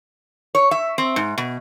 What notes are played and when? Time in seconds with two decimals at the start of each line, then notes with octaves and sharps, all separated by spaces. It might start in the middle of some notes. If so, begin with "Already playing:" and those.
0.55 C#5
0.71 E5
0.98 C4
1.16 G#2
1.38 B2